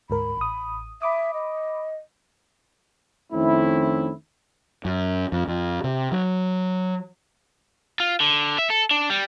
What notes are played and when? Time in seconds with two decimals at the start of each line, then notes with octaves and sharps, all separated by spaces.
0.10 D2 G#2 A#4 B5
0.37 A1 D#6
1.02 E5 B5 D6 D#6
1.34 D#5
3.32 F2 D#3 A3 C4 C#4 E4
4.85 F#2
5.32 F2
5.47 F2
5.84 C3
6.12 F#3
8.00 F4
8.20 D3
8.59 E5
8.70 A4
8.91 D4
9.10 G3